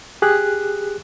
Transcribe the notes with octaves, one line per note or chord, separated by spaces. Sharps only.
G4 G#4 F#6